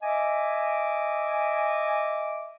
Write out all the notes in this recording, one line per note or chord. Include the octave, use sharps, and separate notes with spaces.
D#5 E5 G#5 D6